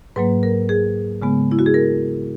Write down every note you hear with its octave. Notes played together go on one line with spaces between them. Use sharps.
G#2 F#3 A#3 B4
A#4
G#4
C#3 G#3 B3
E4
F#4
G#4
A#4